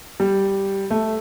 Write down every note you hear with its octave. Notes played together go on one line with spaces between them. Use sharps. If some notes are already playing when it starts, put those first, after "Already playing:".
G3
A3